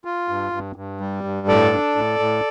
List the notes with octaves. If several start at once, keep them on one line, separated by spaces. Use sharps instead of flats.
F4
G2
G2
G2
G3
G2
A2 A4 D5
D4
A2
A2